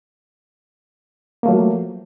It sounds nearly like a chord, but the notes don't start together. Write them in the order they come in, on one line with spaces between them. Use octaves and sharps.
A#3 A3 F#3 F3